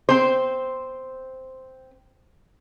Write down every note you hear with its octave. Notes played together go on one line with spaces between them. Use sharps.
C4 C5